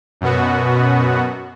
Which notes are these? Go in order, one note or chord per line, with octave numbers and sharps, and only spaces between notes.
F#2 B2 B3 F#4